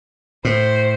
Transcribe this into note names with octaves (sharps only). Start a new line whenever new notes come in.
A2 C5